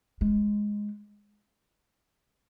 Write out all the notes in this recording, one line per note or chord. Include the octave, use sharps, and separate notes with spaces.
G#3